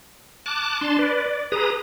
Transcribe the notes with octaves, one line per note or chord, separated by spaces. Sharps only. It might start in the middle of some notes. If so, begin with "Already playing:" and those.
A5 D6 F#6
D4 A5 C6
B4 D5
D5
G#4 B4 A#5 D#6